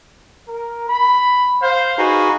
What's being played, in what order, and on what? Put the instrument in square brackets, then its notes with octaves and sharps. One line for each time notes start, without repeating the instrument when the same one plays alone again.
[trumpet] A#4
B5
[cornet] C5 [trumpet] F5
[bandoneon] D#4 G#4 B4 [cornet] F#4